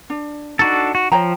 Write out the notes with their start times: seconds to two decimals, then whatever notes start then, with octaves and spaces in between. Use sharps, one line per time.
0.10 D4
0.59 D4 D#4 F#4 A4
0.95 F#4
1.12 F3 C#5 G5 A#5